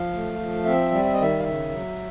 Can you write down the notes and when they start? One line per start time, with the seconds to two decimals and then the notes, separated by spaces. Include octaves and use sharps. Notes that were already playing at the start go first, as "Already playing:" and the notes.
Already playing: F3 F5
0.13 A3
0.39 F3
0.65 C4 E5
0.91 G3
1.04 E5
1.13 D#5
1.17 D#3 E5
1.39 F5
1.43 C#3 E5
1.70 F#3